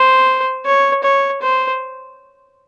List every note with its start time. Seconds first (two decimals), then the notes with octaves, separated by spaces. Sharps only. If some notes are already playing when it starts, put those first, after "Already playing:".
Already playing: C5
0.66 C#5
1.04 C#5
1.42 C5